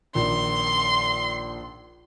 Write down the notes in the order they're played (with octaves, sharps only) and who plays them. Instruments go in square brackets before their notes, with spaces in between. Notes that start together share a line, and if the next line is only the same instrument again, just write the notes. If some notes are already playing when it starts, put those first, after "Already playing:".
[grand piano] A#1 D#3 [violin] C6